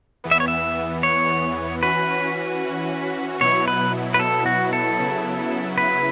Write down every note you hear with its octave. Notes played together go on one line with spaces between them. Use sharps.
E2 E3 B3
E5
C#5
E5
C#5
E3 C#4 F#4 B4
B2 F#3 B3 E4 C#5
B4
B4
A4
F#4
A4
C#3 F#3 B3 E4
B4